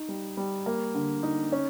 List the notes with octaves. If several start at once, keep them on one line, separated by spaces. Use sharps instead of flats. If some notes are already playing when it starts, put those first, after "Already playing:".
Already playing: D#4
G3
G3
A#3
D3
D#4
C#4